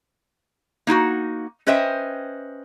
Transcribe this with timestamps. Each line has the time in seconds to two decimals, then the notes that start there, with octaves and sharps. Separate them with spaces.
0.87 A#3 D#4 E4 F#4
1.67 C#4 B4 C5 D#5 E5 G5